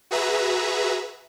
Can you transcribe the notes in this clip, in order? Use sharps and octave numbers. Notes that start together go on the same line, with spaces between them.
F#4 G#4 B4 E5 A#5